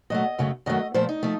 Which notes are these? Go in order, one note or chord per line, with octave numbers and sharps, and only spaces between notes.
A#2 F#3 A3 D#5
F#2 C#3 A3
F#2 D#3 F#3 A3 D#5
A#2 F3 A3 C5
D#4
F3 A3